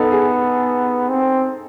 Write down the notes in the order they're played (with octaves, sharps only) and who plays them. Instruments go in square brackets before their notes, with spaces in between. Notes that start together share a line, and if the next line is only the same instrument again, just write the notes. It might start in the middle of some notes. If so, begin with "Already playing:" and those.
Already playing: [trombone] B3 [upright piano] D#4 A4
[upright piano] G#4
[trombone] C4